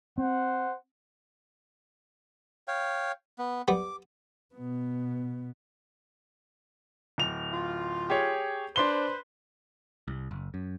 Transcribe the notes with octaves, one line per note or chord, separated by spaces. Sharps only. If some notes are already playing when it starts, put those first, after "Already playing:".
C4 C5 F#5
C#5 F5 G5
B3
G3 B3 D6
B2 B3
D1 F7
F4
G4 G#4 C#5
D4 B4 C5 C6 G7
C2
F#1
F#2